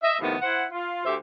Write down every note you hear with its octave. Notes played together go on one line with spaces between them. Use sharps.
D#5 E5
A2 C3 D#3 F3 B3
E4 C5 F#5
F4
D2 G4 C5 E5